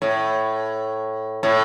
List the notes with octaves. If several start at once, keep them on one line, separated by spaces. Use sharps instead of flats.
A2
A2